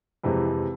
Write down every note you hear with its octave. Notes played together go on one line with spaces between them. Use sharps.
F2 C3 E3 G#3